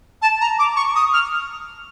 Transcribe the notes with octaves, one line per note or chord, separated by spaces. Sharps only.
A5
A#5
D6
C#6
D#6
F6